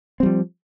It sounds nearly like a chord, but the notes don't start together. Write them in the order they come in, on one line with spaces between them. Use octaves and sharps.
C4 G3 F3